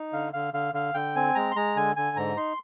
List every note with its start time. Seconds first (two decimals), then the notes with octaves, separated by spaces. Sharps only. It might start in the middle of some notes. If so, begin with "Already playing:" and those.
Already playing: D#4
0.13 D3 F5
0.33 D3 F5
0.54 D3 F5
0.74 D3 F5
0.94 D3 G5
1.16 C4 G#5
1.35 G#3 A#5
1.51 C6
1.55 G#3 A#5
1.76 D3 G#5
1.96 D3 G#5
2.17 G#2 A#5
2.37 D#4 C6